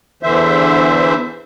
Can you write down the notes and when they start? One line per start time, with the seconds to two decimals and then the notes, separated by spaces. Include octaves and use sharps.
0.23 E2 D3 E3 C5 E5